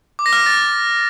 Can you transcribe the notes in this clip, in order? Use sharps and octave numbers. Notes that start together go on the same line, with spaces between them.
D6
A#6
F6
A#6
A6